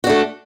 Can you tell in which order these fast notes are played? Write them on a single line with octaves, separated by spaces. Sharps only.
F#4 D4 A3